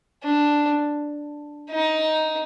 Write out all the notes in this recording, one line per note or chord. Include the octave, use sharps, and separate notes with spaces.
D4
D#4